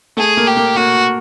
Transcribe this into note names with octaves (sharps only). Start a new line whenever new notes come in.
A3 G#4
A#3
G4
A#3
A#3 F#4